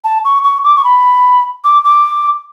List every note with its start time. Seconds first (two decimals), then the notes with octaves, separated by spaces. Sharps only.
0.04 A5
0.25 C#6
0.44 C#6
0.64 D6
0.76 C#6
0.84 B5
1.64 D6
1.85 D6